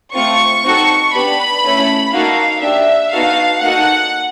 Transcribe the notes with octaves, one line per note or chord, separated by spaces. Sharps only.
A3 C4 F4 C#6
C4 D#4 F#4 A4
B3 D4 G4 B5
A3 C#4 E4
A#3 D#4 F#4 A4 F5
D4 G4 E5
B3 D#4 F#4 A4 F5
A#3 D#4 F#4 A4 F#5